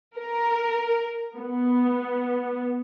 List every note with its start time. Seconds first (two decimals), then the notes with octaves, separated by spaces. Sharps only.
0.17 A#4
1.37 B3